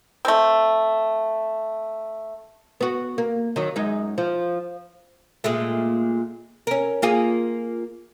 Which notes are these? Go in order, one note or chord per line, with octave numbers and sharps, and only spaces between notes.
A3 C4
B3 F#4
A#3
D#3 F#3
F#2 G#3 D#4
F3
A#2 G#3 A3
C#4 A#4
A#3 F4 G#4